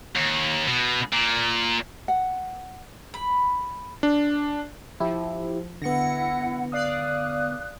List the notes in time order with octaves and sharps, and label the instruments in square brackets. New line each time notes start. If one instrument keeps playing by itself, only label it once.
[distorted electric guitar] D#2
B2
A#2
[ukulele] F#5
[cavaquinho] B5
[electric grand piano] D4
[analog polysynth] F3 [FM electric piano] E4 G4
[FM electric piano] D3 B3 [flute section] E4 F#5 [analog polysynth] A#6 C#7
[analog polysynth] D5 F5 D#6 [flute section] F#6